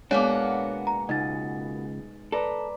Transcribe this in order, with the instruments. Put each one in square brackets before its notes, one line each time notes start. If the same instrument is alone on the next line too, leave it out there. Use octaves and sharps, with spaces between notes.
[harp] B2 G#3 [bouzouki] A#3 B3 F#4 [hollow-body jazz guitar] D4 [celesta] C#5 D6
[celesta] A#5
[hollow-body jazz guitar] C#2 [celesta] D#4 A6 [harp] D#5
[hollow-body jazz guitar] A4 [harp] B4 D5 A#5